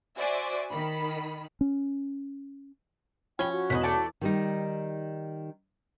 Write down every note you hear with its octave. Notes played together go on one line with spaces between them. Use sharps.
F#4 C5 D5 E5 G#5 D6
D#3 B5
C#4
F3 C#4 G5 B5 G7
F#4
E1 E2 B4 C5 D#5 B5
A3 D5 A5
E3
D#3 G3 D#4